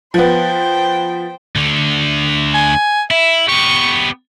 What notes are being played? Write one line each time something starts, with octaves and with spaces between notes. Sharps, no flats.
F3 B3 C5 G5
D2 D3
G#5
E4 E5
B3 G4 C#6